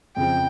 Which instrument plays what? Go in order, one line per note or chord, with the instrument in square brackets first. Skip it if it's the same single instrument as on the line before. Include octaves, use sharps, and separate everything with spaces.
[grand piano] F2 C#3 F3 [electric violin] G5